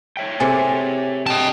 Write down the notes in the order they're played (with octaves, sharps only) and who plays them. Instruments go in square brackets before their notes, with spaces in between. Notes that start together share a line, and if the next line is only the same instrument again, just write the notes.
[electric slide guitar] C#5 E5 G5
[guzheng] C3 A4 [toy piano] G#4 C5 G#5
[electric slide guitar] D3 G5 [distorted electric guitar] D#5 A5